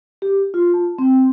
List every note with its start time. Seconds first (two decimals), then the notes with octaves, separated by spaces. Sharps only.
0.22 G4
0.54 F4
0.74 A5
0.98 C4